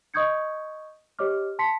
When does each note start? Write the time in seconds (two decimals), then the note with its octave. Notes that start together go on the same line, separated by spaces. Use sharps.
0.14 D#5 C#6 D#6 G6 G#6 C#7
1.19 G4 C#5 D#5 D6 F6
1.59 A5 C6 B6 C#7